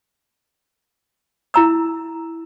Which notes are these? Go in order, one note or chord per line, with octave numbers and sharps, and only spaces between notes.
E4 A#5 E6